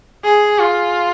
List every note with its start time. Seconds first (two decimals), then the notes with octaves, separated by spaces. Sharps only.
0.24 G#4
0.59 F4